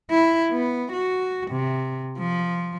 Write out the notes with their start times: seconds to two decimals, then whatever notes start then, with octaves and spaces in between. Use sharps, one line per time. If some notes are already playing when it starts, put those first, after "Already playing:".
0.10 E4
0.51 B3
0.93 F#4
1.51 C3
2.18 F3